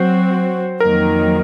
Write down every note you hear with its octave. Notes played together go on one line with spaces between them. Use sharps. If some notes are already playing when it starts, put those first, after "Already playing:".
Already playing: F#3 C4 F#4 C5
F2 D#3 F#3 A#3 A#4